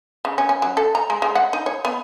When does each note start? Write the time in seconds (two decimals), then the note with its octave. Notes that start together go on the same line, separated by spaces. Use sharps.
0.25 C#3
0.38 C#4
0.49 C#4
0.62 F#3
0.77 A4
0.95 A#5
1.10 G#3
1.22 G#3
1.35 F#5
1.53 D#4
1.66 C#5
1.85 B3